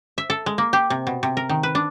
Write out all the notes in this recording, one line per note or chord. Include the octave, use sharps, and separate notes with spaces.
E5
A4
G#3
A#3
G4
C3
B2
C3
A#4
D#3
B4
D4